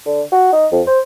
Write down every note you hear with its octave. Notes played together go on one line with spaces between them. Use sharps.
D3
F#4
D#4
F2
C5